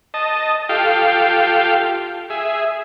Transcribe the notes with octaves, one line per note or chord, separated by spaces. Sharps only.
D#5 A5
F4 G4 A4 F5 G5
G#4 E5